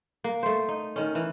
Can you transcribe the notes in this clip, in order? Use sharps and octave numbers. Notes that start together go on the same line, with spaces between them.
A#3
A3 C5
D#4
D#3 C#4
E3